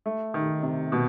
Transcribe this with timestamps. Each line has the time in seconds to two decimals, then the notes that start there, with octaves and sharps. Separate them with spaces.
0.06 A3
0.34 D#3
0.63 C3
0.92 B2